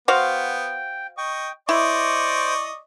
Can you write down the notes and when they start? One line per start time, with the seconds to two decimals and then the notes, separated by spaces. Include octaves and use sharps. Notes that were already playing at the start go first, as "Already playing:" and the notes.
0.08 B3 F#4 C5 F5 G5
1.18 D#5 G5 C#6
1.69 E4 C5 D5 D#5 C#6 D6